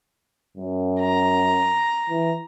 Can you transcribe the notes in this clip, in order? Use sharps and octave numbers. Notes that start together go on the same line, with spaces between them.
F#2
A#5
E3